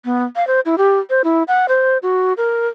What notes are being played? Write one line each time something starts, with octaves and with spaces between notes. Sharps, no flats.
B3
F5
C5
E4
G4
C5
E4
F#5
C5
F#4
A#4